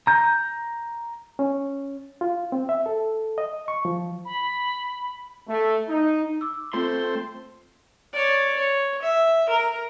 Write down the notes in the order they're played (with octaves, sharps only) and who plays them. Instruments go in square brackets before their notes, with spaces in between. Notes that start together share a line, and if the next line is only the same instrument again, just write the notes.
[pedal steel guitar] A#5 G6
[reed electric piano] C#4
F4
C4
E5
A4
D#5
C#6
F3
[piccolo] B5
[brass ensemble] A3
D#4
[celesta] D6 E6
[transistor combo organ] A3 C5 [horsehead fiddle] C4 [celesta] F4 [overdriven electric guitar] C6
[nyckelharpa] C#5 D5
C#5
E5
A#4